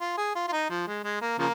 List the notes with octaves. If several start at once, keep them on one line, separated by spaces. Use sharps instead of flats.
F4
G#4
F4
F4
D#4
F3
G#3
G#3
A#3
C#3 F3 A#3